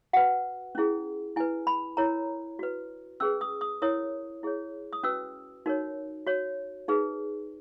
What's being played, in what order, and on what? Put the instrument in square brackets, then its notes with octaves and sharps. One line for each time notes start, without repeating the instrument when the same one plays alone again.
[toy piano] F#4 B4 F#5
C#4 E4 G#4
E4 B4 G#5
B5
E4 A#4 C#5 A#5
F#4 B4
C#4 G#4 B4 E6
D#6
D#6
E4 A#4 C#5 D#6
E4 G#4 C#5
D#6
C#4 F#4 B4 E6
D#4 F#4 A#4 C#5
F#4 C#5
D#4 G#4 B4